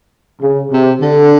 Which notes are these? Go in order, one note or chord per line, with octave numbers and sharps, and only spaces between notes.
C#3
C3
D3